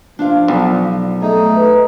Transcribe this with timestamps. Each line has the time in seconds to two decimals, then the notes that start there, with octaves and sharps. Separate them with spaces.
0.19 F3 D4 F4 F5
0.48 B1 D5
1.22 A3 D#4 G#4
1.56 B4